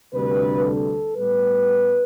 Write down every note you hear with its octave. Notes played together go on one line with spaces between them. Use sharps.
D2 C3 G3 D4 B4
A4
A2 G3 B3 B4